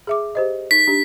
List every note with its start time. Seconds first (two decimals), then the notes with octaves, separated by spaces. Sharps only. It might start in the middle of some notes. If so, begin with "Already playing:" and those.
0.07 G#4 E5 D6
0.35 G4 C5 D#5
0.71 D#4 B6
0.87 D4 G4